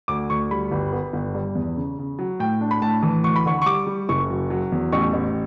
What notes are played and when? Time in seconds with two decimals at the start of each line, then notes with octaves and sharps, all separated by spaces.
0.08 D2 D6
0.30 D2 C#6
0.51 G3 B5
0.71 G1
0.93 B3
1.13 G1
1.34 G2
1.55 E2
1.76 C#3
1.99 C#3
2.19 F#3
2.40 A2 G5
2.61 D4
2.71 B5
2.82 A2 A5
3.03 E3
3.24 D2 C#6
3.36 B5
3.46 D3 C#6
3.62 C#6
3.66 G3 D6
3.87 G3
4.09 F#1 C#6
4.30 F#3
4.50 F#3
4.72 E2
4.92 A1 C#6
5.13 A1